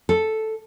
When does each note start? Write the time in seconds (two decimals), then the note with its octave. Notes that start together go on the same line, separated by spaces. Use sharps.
0.09 A4